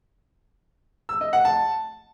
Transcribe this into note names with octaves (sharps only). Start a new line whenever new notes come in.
E6
D#5
F#5
A5